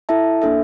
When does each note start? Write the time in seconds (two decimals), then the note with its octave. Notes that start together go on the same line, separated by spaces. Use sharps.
0.09 E4 A4 E5 A5
0.42 A#3 D4 A4 E5